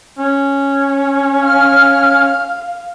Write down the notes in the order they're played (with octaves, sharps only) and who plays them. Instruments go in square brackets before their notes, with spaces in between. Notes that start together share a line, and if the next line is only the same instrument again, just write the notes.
[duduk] C#4
[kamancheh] F5 [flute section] F6